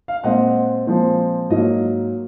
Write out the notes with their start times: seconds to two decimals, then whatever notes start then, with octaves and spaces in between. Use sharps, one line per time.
0.08 F5
0.24 A#2 G#3 C4 D#5 F#5
0.87 A#2 F3 G#3 C4
1.50 G#2 F#3 A#3 D#5